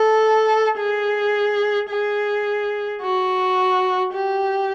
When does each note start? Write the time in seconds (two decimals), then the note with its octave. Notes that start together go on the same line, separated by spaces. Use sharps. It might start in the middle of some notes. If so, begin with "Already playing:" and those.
Already playing: A4
0.78 G#4
1.89 G#4
3.02 F#4
4.13 G4